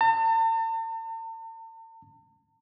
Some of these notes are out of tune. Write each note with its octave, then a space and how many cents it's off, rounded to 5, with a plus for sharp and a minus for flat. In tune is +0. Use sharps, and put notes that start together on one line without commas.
A5 +45